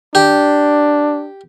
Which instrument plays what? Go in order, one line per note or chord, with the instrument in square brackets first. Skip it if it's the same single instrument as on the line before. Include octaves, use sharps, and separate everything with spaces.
[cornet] D4 [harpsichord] G4